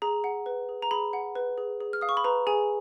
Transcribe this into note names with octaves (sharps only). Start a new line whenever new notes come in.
G#4 A#5
F#5
B4
G#4
A#5
G#4 B5
F#5
B4
G#4
G#4
F6
F5 D#6
C#6
B5
B4 A#5
G#4 G#5